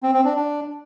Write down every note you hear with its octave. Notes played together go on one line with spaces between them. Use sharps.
C4
C4
D4
D4